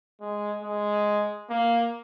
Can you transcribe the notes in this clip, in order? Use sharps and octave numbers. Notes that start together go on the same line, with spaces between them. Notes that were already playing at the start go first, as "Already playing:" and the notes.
G#3
G#3
A#3